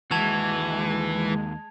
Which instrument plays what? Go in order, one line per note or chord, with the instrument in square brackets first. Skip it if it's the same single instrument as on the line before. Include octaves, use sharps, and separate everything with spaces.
[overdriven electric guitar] D#2 F#4 [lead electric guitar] E3 [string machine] G#3 [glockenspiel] A5 G#6 F7